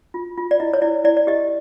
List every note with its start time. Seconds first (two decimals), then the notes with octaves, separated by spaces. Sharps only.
0.14 F4
0.38 F4
0.51 D5
0.60 E4 D#5
0.73 C#5
0.82 E4 D5
1.04 E4 D5
1.17 D5
1.27 G4 D#5